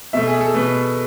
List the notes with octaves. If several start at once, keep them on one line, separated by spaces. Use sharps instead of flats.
B2 A3 E5
G#4
A4
B2 A3 B4